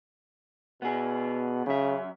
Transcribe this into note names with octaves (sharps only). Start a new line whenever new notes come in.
B2 B3 G#4
F#2 C#3 E5